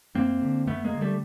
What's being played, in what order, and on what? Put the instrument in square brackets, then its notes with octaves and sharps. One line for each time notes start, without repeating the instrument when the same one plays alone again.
[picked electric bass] F#2 A#3 C4
D3
F#2 A3 B3
G#3 A#3
D3
G3 A3